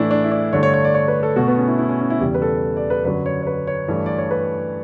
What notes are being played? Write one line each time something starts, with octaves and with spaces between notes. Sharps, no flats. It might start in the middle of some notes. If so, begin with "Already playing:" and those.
Already playing: A2 E3 A3 D4 E4
D4
E4
D4
G2 D3 A3 C#5
C#5
C#5
D5
C#5
B4
A4
B2 A3 F#4
B3
C#4
E4
E4
C#4
C#4
E4
E2 C#3 G3 G4
B4
A4
D5
B4
F#2 D3 F#3 B4
C#5
C#5
B4
C#5
G2 E3 A3
D5
C#5
B4